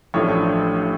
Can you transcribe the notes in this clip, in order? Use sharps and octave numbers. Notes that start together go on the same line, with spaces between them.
A1 A2 F3 A3 D4 C#5